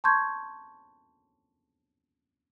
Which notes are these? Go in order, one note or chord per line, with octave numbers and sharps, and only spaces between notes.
A5 C6 C#6 G6 G#6